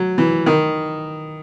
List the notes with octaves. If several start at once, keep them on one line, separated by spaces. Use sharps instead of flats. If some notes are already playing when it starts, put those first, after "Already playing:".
Already playing: F#3
E3
D#3